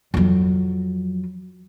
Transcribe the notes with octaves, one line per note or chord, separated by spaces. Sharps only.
F2 F#3